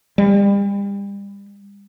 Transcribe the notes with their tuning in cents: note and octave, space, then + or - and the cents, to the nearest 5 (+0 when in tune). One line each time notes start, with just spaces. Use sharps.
G3 +35